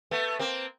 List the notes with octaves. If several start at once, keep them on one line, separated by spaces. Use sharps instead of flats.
A3 B3
A#3 C4